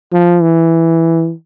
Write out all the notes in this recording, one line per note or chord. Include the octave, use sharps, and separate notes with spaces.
F3
E3